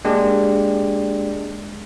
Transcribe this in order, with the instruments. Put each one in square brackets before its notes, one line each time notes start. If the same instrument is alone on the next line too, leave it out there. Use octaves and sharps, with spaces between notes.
[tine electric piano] G#3 A#3 D4 G4